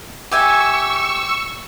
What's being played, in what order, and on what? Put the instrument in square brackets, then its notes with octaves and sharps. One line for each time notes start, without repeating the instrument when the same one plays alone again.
[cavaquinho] G4 E5 G#5 [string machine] C#6 E6